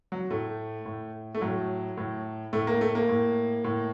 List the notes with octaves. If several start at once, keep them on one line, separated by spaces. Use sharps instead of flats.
F#3
A2 A3
A2
A3
A2 F#3
A2
A2 A3
A#3
A3
A#3
A2
A2